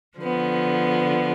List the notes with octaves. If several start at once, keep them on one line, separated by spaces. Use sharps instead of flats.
D3 F3 B3